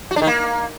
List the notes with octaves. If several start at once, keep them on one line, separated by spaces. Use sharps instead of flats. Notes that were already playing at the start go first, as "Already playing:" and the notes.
F#4
D4
D#3
A#3